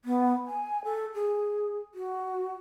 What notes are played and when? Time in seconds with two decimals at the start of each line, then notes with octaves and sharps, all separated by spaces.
0.05 B3
0.47 G#5
0.85 A4
1.15 G#4
1.95 F#4